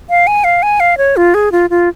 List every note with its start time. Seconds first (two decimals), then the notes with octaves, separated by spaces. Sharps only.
0.10 F5
0.27 G#5
0.44 F5
0.63 G#5
0.80 F5
0.98 C#5
1.17 F4
1.34 G#4
1.52 F4
1.70 F4